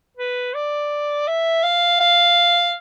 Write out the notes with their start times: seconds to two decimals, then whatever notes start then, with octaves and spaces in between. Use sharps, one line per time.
0.17 B4
0.54 D5
1.27 E5
1.64 F5
2.00 F5